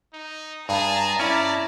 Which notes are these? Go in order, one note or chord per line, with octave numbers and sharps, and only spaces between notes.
D#4
G2 G#4 A5 A#5
C#4 E4 D5